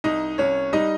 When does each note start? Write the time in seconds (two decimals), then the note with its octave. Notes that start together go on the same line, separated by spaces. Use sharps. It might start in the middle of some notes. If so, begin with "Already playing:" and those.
0.04 C2 D#4 D#5
0.38 C2 C#4 C#5
0.73 G3 D#4 D#5